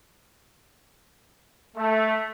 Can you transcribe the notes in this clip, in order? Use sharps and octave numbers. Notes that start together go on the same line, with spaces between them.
A3